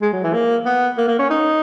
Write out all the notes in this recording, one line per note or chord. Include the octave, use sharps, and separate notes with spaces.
G#3
F#3
E3
A#3
B3
A#3
A#3
C#4
D#4